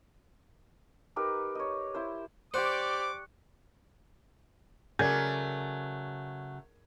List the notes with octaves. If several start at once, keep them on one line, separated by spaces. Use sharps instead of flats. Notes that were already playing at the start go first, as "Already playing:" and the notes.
D#4 G4 A#4 B4
C#5 D#5
E4 C5
G4 C5 D5 C#6 D6 F#6 C#7
C#3 F#3 A3 G#4 A#4 D5 G#5 G#6